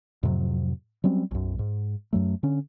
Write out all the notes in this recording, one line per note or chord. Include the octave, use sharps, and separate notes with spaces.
F2 A2 C3 F#3
F#3 G3 C4 C#4
B1 F#2
G#2
F#2 F#3 A3
D3 C#4